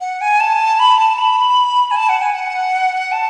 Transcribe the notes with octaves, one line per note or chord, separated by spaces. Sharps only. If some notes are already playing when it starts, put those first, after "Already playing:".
F#5
G#5
A5
B5
A5
B5
G#5
A5
F#5
G#5
F#5
A5